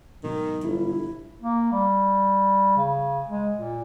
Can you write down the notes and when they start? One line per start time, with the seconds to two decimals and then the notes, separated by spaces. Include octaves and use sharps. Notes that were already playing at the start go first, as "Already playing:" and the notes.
0.23 G#2 B2 D#3 F#3
0.64 G1 E4
1.42 A#3
1.72 G3
2.77 C#3
3.29 G#3
3.54 A#2